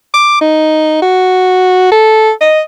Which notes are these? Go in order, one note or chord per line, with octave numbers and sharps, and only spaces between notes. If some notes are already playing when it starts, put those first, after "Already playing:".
D6
D#4
F#4
A4
D#5